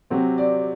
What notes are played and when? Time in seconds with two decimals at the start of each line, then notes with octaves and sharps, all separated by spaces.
0.10 C3 F#3 C4
0.38 D5